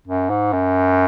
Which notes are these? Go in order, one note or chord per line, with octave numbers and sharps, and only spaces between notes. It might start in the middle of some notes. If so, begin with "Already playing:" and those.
F#2
G#2
F#2